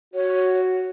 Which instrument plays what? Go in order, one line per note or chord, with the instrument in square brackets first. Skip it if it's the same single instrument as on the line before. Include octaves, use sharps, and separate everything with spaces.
[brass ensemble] F#4 [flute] C#5